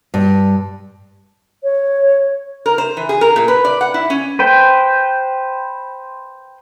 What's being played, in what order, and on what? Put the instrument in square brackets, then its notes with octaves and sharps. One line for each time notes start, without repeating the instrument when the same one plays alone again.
[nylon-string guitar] G2
[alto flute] C#5
[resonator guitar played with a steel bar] A#4
C5
E3
G#4
A#4
A#2
B4
D5
F#5
E4
C#4
[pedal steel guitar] B4 C5 G5